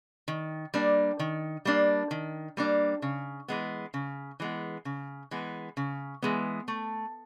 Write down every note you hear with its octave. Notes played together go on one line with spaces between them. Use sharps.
D#3
G3 A#3 D4
D#3
G3 A#3 D4
D#3
G3 A#3 D4
C#3
E3 G#3 B3
C#3
E3 G#3 B3
C#3
E3 G#3 B3
C#3
E3 G#3 B3
A3